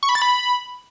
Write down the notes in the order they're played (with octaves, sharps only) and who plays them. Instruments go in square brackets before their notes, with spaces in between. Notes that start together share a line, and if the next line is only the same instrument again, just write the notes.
[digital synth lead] C#6
B5
A6
B5